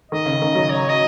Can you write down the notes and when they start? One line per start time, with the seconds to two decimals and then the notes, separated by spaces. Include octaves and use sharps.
0.12 D#3 D#5
0.26 C#3
0.42 D#3
0.55 F#3
0.70 C#5
0.89 D#5